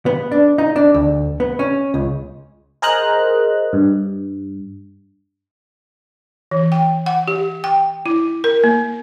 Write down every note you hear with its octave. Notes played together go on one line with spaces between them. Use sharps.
B3
D4
D#4
D4
D2
B3
C#4
C#2
G#4 A#4 C5 D#5 A#5 F#6
G2
E3
G5
F#5
G4
G5
E4
A#4
A#3